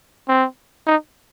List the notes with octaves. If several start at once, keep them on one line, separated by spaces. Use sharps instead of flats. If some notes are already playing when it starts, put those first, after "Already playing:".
C4
D#4